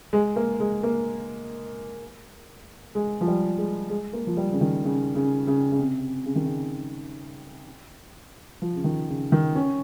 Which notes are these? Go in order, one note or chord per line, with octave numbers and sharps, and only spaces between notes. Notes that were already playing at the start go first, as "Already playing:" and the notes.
G#3
A#3
G#3
A#3
G#3
F3
G3
G#3
G#3
A#3
F3
G3
C#3
D#3
C#3
C#3
C#3
C#3
C3
C#3
D#3
C#3
F3
C#3
D#3
C#3
D#3
C#4